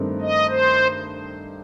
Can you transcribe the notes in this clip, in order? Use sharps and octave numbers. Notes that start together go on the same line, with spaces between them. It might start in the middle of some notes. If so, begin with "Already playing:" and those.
Already playing: G2 D#3 A3 C4 D#4
D#5
C5